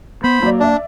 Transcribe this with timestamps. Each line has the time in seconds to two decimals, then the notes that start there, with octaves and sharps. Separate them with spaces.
0.24 B3 C5 B5
0.42 F#3 A#3 D5
0.60 D4 D5 E5